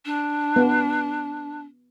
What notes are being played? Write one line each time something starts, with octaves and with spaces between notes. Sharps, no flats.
D4
B3